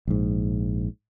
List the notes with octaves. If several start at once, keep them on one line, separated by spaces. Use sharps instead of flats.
A#1 G#2